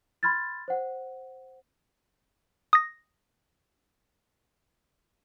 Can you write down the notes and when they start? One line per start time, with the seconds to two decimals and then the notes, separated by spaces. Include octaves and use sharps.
0.23 B5 C6 F6 G#6 A6
0.68 C5 F#5
2.73 D#6 A#6